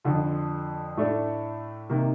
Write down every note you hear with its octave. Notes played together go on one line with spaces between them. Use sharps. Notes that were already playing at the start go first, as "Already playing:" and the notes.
F2 D3 F3
A2 A3 D4 A4
C3 D#3 A#3